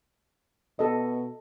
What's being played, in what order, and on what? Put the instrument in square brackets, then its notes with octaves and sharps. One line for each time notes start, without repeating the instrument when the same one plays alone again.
[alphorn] B2 [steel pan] A4 D#5